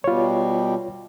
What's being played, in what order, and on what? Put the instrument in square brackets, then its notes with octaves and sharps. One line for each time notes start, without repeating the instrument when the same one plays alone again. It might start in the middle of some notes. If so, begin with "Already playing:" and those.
[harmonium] B2 G3 [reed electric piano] F4 C#5